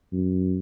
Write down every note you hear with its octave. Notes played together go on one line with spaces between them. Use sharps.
F#2